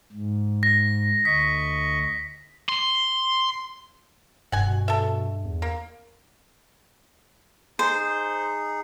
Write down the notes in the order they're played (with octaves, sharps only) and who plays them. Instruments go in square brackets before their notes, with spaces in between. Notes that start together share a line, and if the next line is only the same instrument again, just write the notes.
[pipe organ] G#2
[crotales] A#6
[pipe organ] D2 D#5 C#6 [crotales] B6
[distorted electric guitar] C6
[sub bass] F1 [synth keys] G2 [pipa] F#5 G#5
[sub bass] B2
[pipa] A4 E5
[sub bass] E2
[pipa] A#3
[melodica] D#4 G#4 [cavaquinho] C5